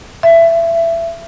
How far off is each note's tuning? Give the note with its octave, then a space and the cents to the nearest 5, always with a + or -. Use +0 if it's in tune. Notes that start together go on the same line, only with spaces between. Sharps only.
E5 +20